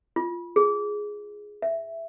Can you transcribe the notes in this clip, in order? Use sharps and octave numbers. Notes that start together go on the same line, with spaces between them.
F4
G#4
E5